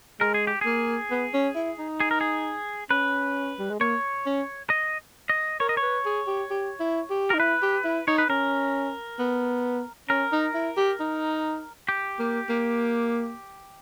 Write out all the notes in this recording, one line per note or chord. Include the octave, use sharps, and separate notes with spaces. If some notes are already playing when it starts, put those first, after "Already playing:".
G#3 A#4
G#4
G4
A#3 G#4
B3
C#4
E4
D#4
G#4
A#4
G#4
C#4 B4
G3
G#3
A#3 C#5
C#4
D#5
D#5
A#4 C#5
D#5
C#5
B4
G#4
G4
G4
E4
G4
D#4 A#4
E4 B4
G4
E4
D#4 C#5
B4
C#4 A#4
B3
C#4 A#4
D#4
E4
G4
D#4
G4
A#3
A#3